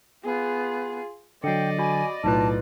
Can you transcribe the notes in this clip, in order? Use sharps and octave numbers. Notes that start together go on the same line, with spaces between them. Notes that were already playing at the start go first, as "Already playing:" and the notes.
B3 F4 G#4
D3 F#3 D5 D#5 G5 C7 C#7
F#4 G#5 B5
B1 A2 D#4 F4 B4 A5